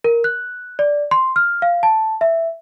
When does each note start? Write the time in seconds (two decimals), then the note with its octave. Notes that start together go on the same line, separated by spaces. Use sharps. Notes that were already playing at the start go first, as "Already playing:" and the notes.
0.04 A#4
0.24 F#6
0.79 D5
1.11 C6
1.36 F6
1.62 F5
1.83 A5
2.21 E5